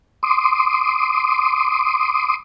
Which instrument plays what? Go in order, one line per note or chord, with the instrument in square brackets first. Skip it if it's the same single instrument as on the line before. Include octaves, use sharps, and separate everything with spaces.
[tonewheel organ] C6 D6 D#6